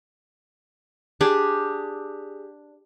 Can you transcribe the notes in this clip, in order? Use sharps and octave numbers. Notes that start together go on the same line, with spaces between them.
D4 G4 G#4